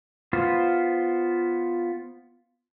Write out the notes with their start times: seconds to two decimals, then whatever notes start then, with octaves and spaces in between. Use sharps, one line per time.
0.33 B3 F4 C5